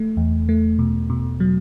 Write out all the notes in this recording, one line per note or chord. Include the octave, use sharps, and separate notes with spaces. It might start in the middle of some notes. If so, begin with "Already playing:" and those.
Already playing: A3
E2
A3
B2
B2
F#3